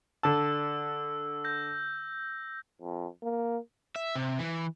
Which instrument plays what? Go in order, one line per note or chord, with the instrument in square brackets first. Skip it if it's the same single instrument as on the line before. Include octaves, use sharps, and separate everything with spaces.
[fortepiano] D3 A5 [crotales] E6
[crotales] G6 A#6
[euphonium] F2
A#3
[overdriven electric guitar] E5
C3
E3